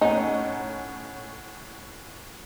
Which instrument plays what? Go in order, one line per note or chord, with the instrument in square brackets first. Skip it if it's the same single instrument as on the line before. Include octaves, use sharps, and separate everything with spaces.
[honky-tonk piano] A2 C#4 F#5 [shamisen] D#4